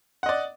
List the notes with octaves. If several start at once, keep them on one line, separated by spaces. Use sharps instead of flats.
D5 D#5 F#5